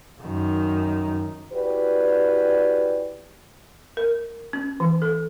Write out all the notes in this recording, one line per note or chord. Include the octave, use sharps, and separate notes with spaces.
F#2 D#3
E4 F#4 G4 B4 D5
A#4
C#4
E3
A4